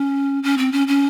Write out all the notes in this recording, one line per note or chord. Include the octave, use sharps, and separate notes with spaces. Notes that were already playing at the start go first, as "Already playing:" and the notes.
Already playing: C#4
C#4
C4
C#4
C#4